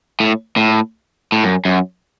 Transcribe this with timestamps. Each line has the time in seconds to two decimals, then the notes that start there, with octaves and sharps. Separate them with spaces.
0.20 A2
0.57 A2
1.32 A2
1.44 F#2
1.65 F#2